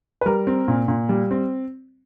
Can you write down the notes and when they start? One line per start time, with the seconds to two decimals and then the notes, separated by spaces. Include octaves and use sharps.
0.21 B4
0.26 G3 A#4
0.47 C4
0.68 A#2
0.88 A#2
1.09 G3
1.31 C4